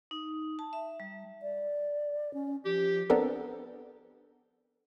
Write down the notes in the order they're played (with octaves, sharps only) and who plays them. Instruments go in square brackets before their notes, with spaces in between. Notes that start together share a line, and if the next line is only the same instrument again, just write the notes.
[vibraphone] D#4
A5
E5
G3
[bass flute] D5
C#4
[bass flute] F3 [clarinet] G4
[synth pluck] B3 C4 D4 A4 A#4